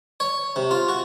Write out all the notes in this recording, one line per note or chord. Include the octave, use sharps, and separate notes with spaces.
C#5
C3
F4
F#4